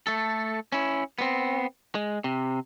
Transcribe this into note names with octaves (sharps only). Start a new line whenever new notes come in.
A3 A4
C#4 E4
B3 C4
G#3
C3